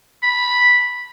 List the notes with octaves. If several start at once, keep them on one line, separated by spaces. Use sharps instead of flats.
B5